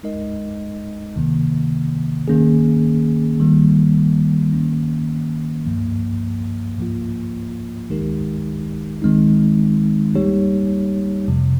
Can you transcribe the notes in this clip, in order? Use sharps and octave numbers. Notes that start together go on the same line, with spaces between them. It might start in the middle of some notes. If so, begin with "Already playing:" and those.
G#3 D#4 A#4 D#5
C3 D#3 A#3
D#3 A#3 C#4 G#4
D#3 G3 A#3
D#3 A#3 C#4
G2 F3 A#3
G#2 F3 A#3 F4
D#3 G#3 D#4 G4 A#4
D#3 G#3 C4 D#4
G3 A#3 D#4 G4 C#5
F2 C3 F3